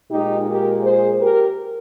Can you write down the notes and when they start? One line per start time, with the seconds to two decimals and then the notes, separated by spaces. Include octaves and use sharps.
0.10 A#2 G#3 D#4 G4
0.47 G4 A#4
0.83 G#4 C5
1.21 G4 A#4